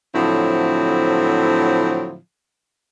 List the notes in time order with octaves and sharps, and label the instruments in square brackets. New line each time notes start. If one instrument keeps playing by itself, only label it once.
[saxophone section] A2 D3 F3 F#3 C4 E4